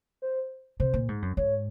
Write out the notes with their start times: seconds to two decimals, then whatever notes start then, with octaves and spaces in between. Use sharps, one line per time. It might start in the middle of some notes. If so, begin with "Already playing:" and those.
0.22 C5
0.80 C3 C5
0.94 A#2
1.08 G#2
1.22 F#2
1.37 G#2 C#5